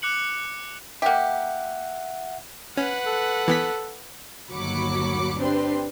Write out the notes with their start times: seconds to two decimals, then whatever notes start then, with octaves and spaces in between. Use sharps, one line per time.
0.02 D6 F#6 C#7 F#7
1.02 A#3 G4 E5 F#5
2.77 C#4 B4 F#5
3.07 A4
3.48 E3 B3 B6
4.50 G1 D#2 F#3 B5 D6 C#7
5.40 C4 D4 G4 B4 C6